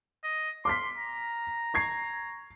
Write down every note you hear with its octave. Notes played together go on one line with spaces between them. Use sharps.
D#5
C6 D6 F6 B6
A#5
C#6 G#6 C7